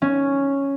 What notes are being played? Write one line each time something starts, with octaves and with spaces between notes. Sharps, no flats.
C#4